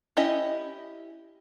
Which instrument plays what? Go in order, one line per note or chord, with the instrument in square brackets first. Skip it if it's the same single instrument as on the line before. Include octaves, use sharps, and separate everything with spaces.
[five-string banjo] C#4 E4 G4 D#5